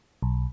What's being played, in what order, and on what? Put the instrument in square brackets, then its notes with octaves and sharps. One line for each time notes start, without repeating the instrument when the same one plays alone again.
[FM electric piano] B1